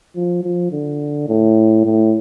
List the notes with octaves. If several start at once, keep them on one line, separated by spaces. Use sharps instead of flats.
F3
F3
D3
A2
A2